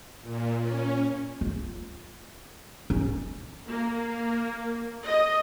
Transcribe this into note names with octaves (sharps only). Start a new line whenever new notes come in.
A#2
C#4
F4
C#4
A#3
D#5